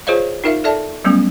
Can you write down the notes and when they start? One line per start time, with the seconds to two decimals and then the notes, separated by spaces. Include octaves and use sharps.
0.07 F4 G#4 C5 C#5 D#5 F5
0.44 D#4 F4 A#4 E5 F5
0.64 A4 D5 E5 A5
1.04 F#3 G3 A3 B3 C#4